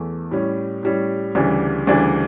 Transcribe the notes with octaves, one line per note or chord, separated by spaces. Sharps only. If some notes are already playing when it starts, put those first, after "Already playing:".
Already playing: E2 E3 A3
A2 G3 C#4
A2 G3 C#4
D2 C#3 E3 G3 D4
D2 C#3 E3 G3 D4